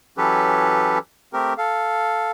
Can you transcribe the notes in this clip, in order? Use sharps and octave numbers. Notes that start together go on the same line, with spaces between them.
E3 F#3 C#4 G4 A4 B4
A3 C4 G4 A#4
A4 F5